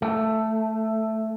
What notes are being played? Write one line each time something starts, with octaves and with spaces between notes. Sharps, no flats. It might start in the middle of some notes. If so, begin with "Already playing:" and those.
A3